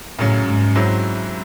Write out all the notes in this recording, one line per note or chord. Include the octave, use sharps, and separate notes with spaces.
F#2 A2 C#3 F#3 C#4
G#2
G#2 F#3 C4 E4 C5